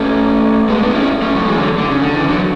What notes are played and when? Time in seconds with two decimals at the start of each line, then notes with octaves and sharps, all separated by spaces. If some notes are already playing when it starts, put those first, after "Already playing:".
Already playing: A3 C#4
0.69 G#3 B3
0.82 B3 D4
0.95 C#4 E4
1.22 A3 C#4
1.35 F#3 A3
1.49 E3 G#3
1.58 D3 F#3
1.78 D3
1.88 C#3
2.02 D3
2.15 C#3 E3
2.28 D3 F#3